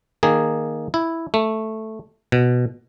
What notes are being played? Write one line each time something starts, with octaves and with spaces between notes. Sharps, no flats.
D#3 A#3 G#4
E4
A3
B2